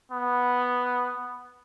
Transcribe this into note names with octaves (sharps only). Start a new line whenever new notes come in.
B3